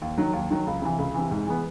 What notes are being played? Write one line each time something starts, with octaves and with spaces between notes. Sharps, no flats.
D#2
D#3 F#3
D#2
D#3 F#3
C#2
C3 E3
C#2
C3 E3
G#2
E3 G#3 B3